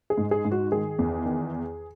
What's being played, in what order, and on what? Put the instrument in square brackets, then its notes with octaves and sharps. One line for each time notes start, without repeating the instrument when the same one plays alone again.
[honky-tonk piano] G#4
G#2
G#4
G#2
F#4
D#3 G#4
E2
D#3